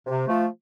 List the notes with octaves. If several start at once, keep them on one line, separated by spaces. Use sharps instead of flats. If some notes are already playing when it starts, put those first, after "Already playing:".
C3
F3 A3